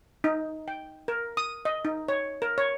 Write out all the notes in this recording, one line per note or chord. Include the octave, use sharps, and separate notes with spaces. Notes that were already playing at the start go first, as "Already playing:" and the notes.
D#4
G5
A#4
D#6
D#5
D#4
C#5
A#4
C#5